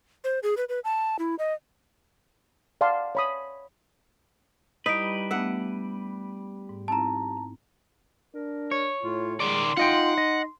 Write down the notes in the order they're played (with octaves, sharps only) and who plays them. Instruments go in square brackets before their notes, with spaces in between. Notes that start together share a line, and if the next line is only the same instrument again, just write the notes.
[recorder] C5
G#4
B4
B4
A5
E4
D#5
[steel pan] D5 F5 F#5 A5 C6
C#5 B5 D#6
[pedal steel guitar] G3 B4 [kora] D#4 [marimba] E4 [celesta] B6 D7
[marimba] A3 B3 D4 [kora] E5 F#5
[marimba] G#2
[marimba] C4 D#4 E4 [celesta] A5 A#5
[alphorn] D4 [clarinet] A#4
[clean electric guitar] C#5
[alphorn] A2 [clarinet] F4
[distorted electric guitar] D#3 D5 [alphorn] G#3 [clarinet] C6
[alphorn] D#4 [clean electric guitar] F4 D#5 G5 [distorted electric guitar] F#5
[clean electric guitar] D#5